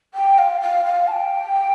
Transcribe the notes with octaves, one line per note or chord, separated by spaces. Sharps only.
G5
F5
F5
F5
A5
G5